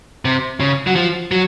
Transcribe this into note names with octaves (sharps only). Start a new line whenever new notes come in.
C3
C#3
F#3
F3
F#3